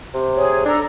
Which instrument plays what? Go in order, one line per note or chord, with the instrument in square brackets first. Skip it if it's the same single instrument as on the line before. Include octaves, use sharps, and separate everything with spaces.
[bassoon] C3
[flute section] G#4 C#5
[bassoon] D4 [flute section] A4 A#5